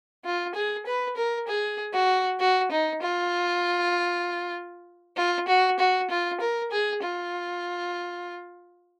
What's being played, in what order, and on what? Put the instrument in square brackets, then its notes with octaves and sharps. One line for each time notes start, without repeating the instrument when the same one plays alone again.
[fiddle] F4
G#4
B4
A#4
G#4
F#4
F#4
D#4
F4
F4
F#4
F#4
F4
A#4
G#4
F4